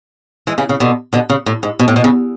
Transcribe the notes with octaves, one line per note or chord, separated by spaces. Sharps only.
E3 G#3
C#3 E3
C#3
B2 D3
B2 D3
C#3
A2
G#2
B2
A2
B2
C#3